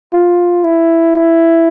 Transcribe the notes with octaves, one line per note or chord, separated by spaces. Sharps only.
F4
E4
E4